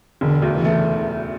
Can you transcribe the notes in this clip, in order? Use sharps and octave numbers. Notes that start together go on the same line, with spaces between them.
E1 D3
D2
C#3 E3
A3